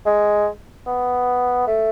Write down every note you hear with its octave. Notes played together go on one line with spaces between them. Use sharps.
G#3
B3
A3